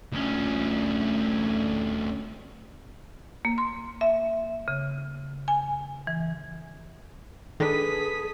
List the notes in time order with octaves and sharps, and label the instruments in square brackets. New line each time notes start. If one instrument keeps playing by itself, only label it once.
[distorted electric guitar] D2 C#4
[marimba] A#3
C6
E5
C#3
G#5
E3
[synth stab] D#3 D4 [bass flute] G#4 [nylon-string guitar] A4 B4 [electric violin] D#6 B6